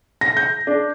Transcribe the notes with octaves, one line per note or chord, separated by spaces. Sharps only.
A#6
G6
D4